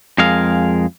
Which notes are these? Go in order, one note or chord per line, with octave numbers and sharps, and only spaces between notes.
F2 G#3 G#4 A#4 F5